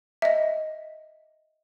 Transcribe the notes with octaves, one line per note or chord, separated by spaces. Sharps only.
D#5 E5